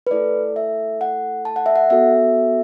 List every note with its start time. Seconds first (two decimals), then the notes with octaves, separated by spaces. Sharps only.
0.07 B4
0.11 A3 E4 A4 D5
0.56 E5
1.01 F#5
1.45 A5
1.56 F#5
1.66 E5
1.76 F#5
1.90 B3 F#4 A4 E5